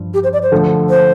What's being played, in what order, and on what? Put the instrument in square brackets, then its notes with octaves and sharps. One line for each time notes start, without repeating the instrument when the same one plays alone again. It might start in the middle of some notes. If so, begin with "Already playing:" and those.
Already playing: [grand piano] G2 F3
[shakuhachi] G4
C5
D5
C5
[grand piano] D3 F3 A3
[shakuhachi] C5